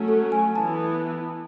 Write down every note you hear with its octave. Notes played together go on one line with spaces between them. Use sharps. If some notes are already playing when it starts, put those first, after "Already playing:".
Already playing: F#3 A3 C#4
A4
G#5
E3 B3 E4 A5